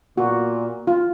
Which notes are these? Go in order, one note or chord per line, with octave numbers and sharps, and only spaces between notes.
A#2 F#4
F4